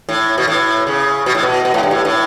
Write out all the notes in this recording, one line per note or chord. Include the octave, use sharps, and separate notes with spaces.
A2
B2
A2
C#3
B2
A2
B2
B2
A2
G2
A2
A2